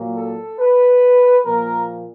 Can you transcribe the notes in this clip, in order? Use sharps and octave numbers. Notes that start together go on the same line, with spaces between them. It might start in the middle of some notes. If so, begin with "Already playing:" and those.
Already playing: A#2 F#3 A#3
A4
B4
A#2 F3 A#3 A#4